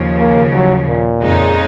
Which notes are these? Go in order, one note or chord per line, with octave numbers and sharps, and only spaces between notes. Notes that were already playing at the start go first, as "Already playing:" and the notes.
Already playing: D#2 C#3 F3
A#3
F#3
A#2
F2 C#3 G#3 D#4